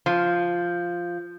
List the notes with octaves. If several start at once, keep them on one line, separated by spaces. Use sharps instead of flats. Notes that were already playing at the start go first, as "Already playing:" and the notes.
F3